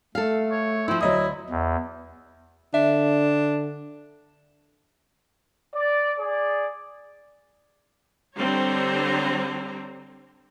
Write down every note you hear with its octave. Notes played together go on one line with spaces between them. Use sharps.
A3 A4 F5
C#5
F3 C4 E4
D2 F#3 E4 D#5 D#6
E2
D3 D4 E5
D5
G#4 D5
D3 G3 C4 C5 C#5 A#5